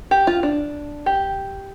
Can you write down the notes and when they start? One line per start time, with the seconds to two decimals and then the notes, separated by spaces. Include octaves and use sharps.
0.11 G4
0.27 F4
0.43 D4
1.06 G4